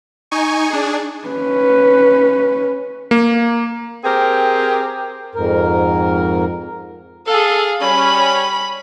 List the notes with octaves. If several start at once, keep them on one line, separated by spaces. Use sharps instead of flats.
D#4 G#5 C#6
D4 G#4
C#4 B4
A#3
C4 G4 G#4 A#4
F2 G#2 A#4
G#4 A4 F5
G3 C#4 B5